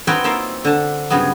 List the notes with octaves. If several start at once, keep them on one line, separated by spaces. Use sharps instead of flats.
C4 D#4 F#4 B4 C#5 G5
A#3 D#4 F4 E5 F5
D3 A5
G2 C#3 F#3 B3